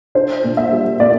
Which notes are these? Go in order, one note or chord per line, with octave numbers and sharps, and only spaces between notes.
D4 C5
A#2
E5
G3
A#2 D5